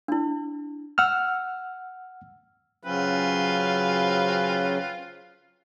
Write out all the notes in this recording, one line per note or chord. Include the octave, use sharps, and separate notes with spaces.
D4 E4
F#5 E6 F6
C#3 F#3 C4 C#4 F4 B4